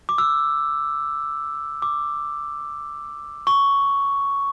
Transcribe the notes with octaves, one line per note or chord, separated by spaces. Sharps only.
D6
E6
D6
C#6